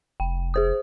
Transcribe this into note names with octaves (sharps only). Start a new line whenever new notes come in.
F1 G5
G#4 C5 D#6